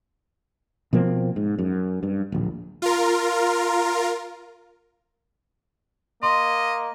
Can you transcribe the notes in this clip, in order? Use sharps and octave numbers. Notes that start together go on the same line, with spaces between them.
B2 F3 A#3 C4
G#2
F#2
G2
D1 A#1
F4 A#4
A#3 D#5 C6